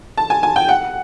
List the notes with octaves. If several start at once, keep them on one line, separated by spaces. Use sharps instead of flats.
A5
G#5
G#5
G5
F#5